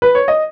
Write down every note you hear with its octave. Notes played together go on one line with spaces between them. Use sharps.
B4
C#5
D#5